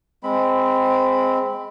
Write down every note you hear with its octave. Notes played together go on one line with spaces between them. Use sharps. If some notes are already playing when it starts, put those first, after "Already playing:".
G#3 C4 B5